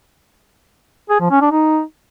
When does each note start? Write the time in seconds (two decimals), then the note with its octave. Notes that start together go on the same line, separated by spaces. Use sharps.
1.10 G#4
1.20 F3
1.31 C#4
1.41 D4
1.51 D#4